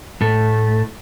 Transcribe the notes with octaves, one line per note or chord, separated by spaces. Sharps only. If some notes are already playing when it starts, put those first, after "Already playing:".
A2 A3